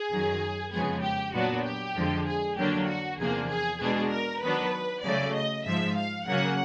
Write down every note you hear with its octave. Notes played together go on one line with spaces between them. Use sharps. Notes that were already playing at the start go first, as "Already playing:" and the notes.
Already playing: G#4
F#2 D#3 F#3
F2 C#3 F3 G#3 B3 G#4
G4
A#2 F#3 B3 D4 F#4
G4
F2 D3 F3 G#3
G#4
D3 F#3 A#3 D4 G4
F#4
E2 C3 F3 A#3 D4 G#4
G#4
B2 G#3 B3 D4 G#4
A#4
D#3 F#3 B3 D4 B4
C#3 F#3 A3 D5
D#5
G#2 F3 G#3 E5
F5
C#3 F#3 A#3 C#4 F#5